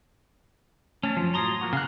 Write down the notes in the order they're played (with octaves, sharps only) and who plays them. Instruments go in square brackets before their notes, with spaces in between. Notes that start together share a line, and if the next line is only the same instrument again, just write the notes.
[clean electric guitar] A3 A5 [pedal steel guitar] C#4
[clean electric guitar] F#2 [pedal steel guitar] F3
[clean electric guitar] A2 F#3 [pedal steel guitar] A#5 C6 D#6
[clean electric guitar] F3 A#3 F#4
[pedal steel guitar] C#3 F#6 [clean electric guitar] F5